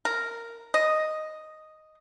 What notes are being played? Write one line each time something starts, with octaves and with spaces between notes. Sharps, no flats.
A#4
D#5